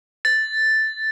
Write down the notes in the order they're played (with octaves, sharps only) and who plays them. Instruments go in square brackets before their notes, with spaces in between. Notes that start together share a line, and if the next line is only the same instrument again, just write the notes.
[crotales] A6